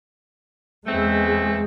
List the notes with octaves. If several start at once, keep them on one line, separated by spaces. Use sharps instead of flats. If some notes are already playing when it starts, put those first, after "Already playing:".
E2 E3 G#3 A3 C4